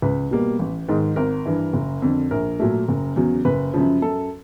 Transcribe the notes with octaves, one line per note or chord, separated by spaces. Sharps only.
C#2 B4
B2 G3 A#3
A1
G#2 D#3 G#3
G#1 A#4
G2 E3
F#1
F2 D3
A#1 A#4
A#2 F#3 A3
F#1
E2 C#3 F#3
F#1 B4
F#2 C#3 F3
F#2 A4